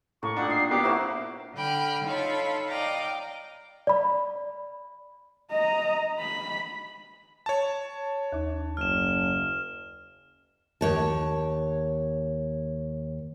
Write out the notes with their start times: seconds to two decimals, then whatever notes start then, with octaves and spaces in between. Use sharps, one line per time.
0.23 A2 A#3 C#6
0.36 A#2 D4 D#4 G4 F#5
0.50 D#5 C7
0.70 A#3 B3 G4 D6
0.84 D3 E4 F#4 A#4 C5
1.55 D3 G5 B5 F6
2.04 D#4 F4 A4 C#5 B5
2.67 D5 D#5 F5 G5 A#5
3.87 D5 B5
5.51 D#5 A#5
6.20 B5
7.46 C#5 A5
8.32 D#2 D#4
8.77 F#1 F6 E7
10.81 D#2 C#5 A5